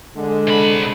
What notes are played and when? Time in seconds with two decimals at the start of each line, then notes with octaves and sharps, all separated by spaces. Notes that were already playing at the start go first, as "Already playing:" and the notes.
0.17 D3 G#3
0.47 C3 B5